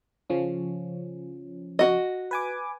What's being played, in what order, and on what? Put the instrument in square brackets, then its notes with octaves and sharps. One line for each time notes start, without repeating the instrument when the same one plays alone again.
[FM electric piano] C#3 F3 C#4
[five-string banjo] F#4 D#5
[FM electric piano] B4 G#5 D6